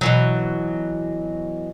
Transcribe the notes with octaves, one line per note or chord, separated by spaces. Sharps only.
B2 E3 F#3